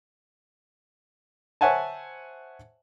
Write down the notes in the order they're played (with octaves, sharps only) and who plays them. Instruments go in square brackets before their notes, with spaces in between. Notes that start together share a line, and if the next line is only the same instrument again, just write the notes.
[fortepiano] C5 C#5 E5 F#5 G#5 A5